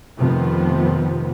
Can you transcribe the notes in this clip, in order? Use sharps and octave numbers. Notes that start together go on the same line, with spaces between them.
F1 F2 C3 D#3 F3 B3